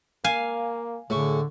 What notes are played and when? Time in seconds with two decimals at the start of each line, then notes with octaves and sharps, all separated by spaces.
0.24 A#3 F5 G#5
1.10 A2 D3 G#4 C#6